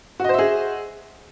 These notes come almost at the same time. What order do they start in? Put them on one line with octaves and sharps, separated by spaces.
F#4 D#5 C5 E5 G#4